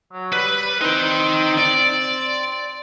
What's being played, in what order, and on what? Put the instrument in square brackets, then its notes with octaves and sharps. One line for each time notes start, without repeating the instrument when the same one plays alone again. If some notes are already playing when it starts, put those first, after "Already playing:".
[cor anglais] F#3
[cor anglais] G3 [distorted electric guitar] B4
[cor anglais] C4 [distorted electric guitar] D#4 G5
[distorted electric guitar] D5